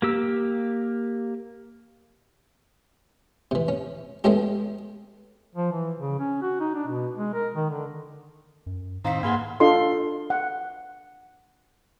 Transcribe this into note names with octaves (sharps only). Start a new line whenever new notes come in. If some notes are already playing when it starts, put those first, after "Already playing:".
A#3 G4 E6
C3 E3
C#4
G#3 A3 B3 C#4 E4 G4
F3
E3
C#3
C#4
F#4
D#4
D4
B2
G#3
A#4
D#3
D3
F#2
A2 D#3 C4 F5 A#5 B6
G#2 A#3 G#4 B4 F5 F#5 G#5 C6
D4 F4 A4 D#5 C6
F#5